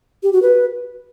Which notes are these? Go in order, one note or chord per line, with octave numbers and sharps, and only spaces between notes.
G4
F#4
B4